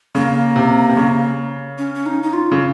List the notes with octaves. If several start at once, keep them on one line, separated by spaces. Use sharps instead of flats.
C#3 A#3
C3
C3
C#3
C#4
C#4
D#4
D#4
F4
C#3